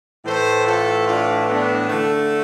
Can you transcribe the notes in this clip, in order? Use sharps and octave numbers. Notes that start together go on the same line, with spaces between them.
A2 E3 A3 A4 C5
F4 A4
D4 F4
B3 D4
D3 A3